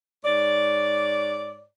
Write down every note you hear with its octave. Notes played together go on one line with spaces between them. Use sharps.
G#2 C#5 D5